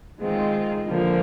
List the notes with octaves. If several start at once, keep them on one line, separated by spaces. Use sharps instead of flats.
D#3 G#3 C4 F4
D3 F3 A#3